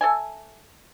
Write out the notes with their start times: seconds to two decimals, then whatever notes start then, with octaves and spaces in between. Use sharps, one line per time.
0.01 A4 E5 G#5